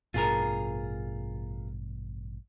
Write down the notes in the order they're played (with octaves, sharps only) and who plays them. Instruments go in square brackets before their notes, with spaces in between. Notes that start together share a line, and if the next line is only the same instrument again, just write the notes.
[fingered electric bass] A1 G2 B2 [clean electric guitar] F4 G#4 A#4